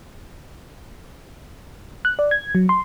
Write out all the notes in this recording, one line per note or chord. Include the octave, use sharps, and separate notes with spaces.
F#6
D5
G#6
F#3
C6